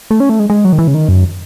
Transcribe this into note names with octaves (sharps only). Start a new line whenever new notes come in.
A3
C#4
A3
G#3
G#3
F#3
D#3
E3
C#3
D#3
F#2